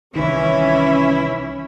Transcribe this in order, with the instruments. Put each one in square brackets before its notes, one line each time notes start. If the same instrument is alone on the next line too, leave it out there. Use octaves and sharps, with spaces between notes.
[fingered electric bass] C2 D#3 [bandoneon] E3 [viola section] C#4 [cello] E4